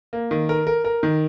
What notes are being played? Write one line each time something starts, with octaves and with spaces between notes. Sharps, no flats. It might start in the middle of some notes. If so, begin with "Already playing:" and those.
A#3
D#3
A#4
A#4
A#4
D#3